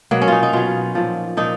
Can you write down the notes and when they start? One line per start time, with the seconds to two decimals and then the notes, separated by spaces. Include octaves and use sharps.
0.11 B2 F#3 A#3
0.21 C#4
0.28 D#4 F4
0.43 D#4
0.53 B2 F#3 F4
0.95 A#2 F3
1.37 A#2 F3 D#4